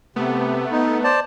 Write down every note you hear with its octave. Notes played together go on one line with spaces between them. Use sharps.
C3 A3 B3
D#4
C5 D5 A5